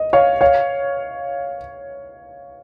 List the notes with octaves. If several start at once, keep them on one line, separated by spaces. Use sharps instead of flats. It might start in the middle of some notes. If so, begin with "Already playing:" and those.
Already playing: D#5
C#5 F5
C#5 F5